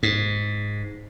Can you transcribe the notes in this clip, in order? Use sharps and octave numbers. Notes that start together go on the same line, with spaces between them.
G#2